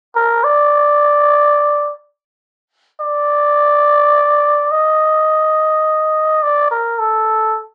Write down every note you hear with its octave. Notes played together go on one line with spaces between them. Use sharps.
A#4
D5
D5
D#5
D5
A#4
A4